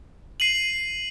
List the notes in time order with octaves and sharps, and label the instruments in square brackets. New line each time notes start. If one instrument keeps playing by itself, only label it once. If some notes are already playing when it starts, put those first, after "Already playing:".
[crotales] C7 D#7 F#7